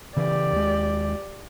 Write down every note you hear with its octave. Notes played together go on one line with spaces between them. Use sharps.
C#3 E3 G4 D5
D#2 G#3